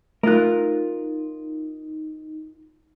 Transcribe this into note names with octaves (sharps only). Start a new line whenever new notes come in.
A3 D#4 F4 A#4 F#6